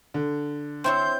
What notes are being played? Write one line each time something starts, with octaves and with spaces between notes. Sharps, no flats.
D3
C4 E4 C#5 C6 G6